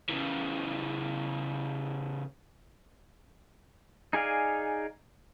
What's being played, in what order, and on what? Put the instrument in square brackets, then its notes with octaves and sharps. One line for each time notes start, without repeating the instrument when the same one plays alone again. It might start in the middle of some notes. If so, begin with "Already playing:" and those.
[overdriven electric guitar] C#3 E3
[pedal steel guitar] D#4 G#4 D5 F5 G#5